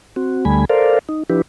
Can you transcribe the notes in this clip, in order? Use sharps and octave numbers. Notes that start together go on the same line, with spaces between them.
C4 F#4
D2 D3 G3 A3 G#5 B5
A4 A#4 C5 D5 F5
D#4
F3 D4 E4 G4 B4